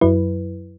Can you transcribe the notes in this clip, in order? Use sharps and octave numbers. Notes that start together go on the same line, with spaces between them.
F#2 F#3 E4 B4